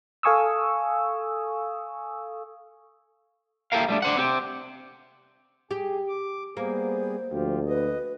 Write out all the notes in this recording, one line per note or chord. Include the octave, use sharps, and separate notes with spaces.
A4 F5 G#5 C#6 D#6 E6
A#3 E4 G4 A4 A#4 F5
G3 A3 D4
D4 C5 F#5
C4 G4
G4 G#4
D6
G3 A#3 B3 G#4 C5
D2 F3 F4 G4
B4 D#5